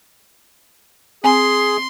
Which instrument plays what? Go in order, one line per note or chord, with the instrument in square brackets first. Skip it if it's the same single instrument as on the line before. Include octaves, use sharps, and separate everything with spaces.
[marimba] C4 G#5 [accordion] G#4 [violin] C6